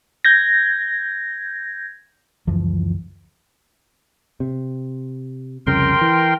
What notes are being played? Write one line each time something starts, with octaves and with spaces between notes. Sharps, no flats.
G6 G#6 A#6
C#2 F#2 E3 F3
C3
C2 F2 C#3 A#4 G5 C6
E3